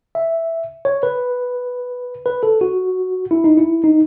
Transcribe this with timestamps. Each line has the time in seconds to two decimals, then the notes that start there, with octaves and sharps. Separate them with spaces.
0.15 E5
0.85 C#5
1.03 B4
2.26 B4
2.43 A4
2.61 F#4
3.31 E4
3.44 D#4
3.57 E4
3.84 D#4